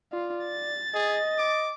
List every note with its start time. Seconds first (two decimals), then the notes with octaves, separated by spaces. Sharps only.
0.12 F4 D5
0.46 A6
0.94 G#4 D#5
1.39 D6